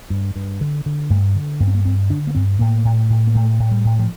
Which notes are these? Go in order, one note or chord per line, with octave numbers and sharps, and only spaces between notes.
G2
G2
D3
D3
G2 A3
D3
G2 A#3
C4
A#3
G2 C4
D3 D4
A#3
G2 C4
A2 A#3
A2
A2
A#3
A2 A3
A2
G3
A2
F3